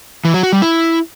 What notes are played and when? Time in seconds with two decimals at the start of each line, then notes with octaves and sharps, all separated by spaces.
0.25 E3
0.34 F#3
0.43 F#4
0.53 G3
0.62 E4